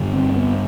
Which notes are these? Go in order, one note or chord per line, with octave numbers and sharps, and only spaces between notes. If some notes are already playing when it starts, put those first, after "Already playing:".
Already playing: G2 D3
C4
B3